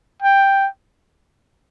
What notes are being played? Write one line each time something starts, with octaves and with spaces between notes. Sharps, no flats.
G5